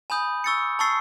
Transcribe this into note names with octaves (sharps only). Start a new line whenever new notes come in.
G#5 B5 D#6 G6
C#6 E6 A6 C#7
A5 C#6 E6 A6 C7